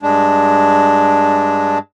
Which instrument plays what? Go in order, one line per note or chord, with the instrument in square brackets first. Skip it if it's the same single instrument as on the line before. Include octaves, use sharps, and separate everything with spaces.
[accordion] G2 G#3 D4